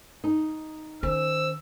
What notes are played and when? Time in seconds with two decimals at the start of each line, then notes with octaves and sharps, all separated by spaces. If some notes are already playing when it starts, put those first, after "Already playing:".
0.24 D#4
1.03 D#3 C#4 C5 E6